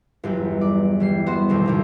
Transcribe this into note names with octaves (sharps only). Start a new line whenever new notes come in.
G1 E2 F#3
D5
E3 G3 C7
B3 F#4 C5
B1 F2 D#3
G#1 F2 C3